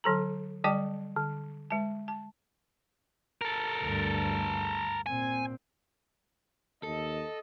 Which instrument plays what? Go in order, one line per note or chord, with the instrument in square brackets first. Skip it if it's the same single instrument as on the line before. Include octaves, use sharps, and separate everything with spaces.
[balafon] D3 F#3 A4 A#5
D3 G3 D5 G5 A5 D6
D3
G#3 A5
A5
[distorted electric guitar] A4 A#4
[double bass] D2 G2
[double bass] A#2 C4 [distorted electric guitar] G#5
[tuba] D#2 [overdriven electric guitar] A4 [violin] D#5